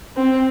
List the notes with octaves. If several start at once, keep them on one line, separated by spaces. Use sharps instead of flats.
C4